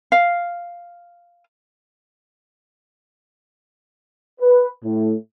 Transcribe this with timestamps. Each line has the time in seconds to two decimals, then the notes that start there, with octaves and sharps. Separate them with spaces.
0.12 F5
4.40 B4
4.84 A2